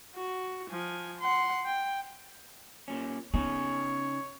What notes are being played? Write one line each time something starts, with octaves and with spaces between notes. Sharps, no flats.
F#4
F3 G#5
F#5 C6
G5
A#2 C#4
C#3 B3 D#4 G#4 C#5